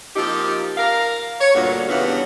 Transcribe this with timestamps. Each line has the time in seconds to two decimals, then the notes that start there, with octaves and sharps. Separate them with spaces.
0.16 F3 A#3 C4 D#4 G4
0.78 A#4 F5
1.40 C#5
1.54 D2 G2 A#2 A#3 F#4
1.89 G2 C#3 E3 B3 C#5 F5